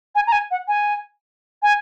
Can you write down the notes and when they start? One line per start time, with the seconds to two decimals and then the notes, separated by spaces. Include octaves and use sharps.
0.15 G#5
0.27 A#5
0.32 G#5
0.51 F#5
0.68 G#5
1.63 G#5